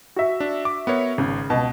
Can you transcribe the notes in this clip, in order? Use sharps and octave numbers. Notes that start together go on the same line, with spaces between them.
F#4 E5
D4
D6
B3 A#4 C#5
G#1 C#3
C#2 B2 A5